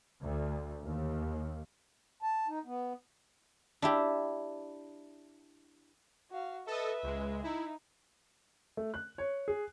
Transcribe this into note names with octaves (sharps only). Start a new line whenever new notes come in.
D2
D#2
A5
D#4
B3
D4 E4 G4
F#4 F5
A4 B4 D#5 E5
C#2 G#3
D#4 E4
A3
F#6
C#5
G#4